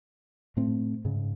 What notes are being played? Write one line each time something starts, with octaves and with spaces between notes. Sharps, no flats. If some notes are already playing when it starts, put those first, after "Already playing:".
A2 A3 C4
G#2 C#3